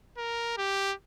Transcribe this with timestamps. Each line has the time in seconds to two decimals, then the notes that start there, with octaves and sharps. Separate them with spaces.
0.17 A#4
0.57 G4